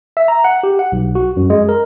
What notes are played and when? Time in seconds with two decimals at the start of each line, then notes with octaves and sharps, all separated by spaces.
0.17 E5
0.28 A#5
0.44 F#5
0.63 G4
0.79 F#5
0.92 B1
1.15 F#4
1.37 F#2
1.50 G#3
1.69 A#4